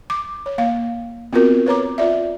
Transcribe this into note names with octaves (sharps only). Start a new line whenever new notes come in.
D6
C#5
A#3 F5
B3 C4 F4 F#4 A#4
B4 C#5 A#5 D6
F4 D5 E5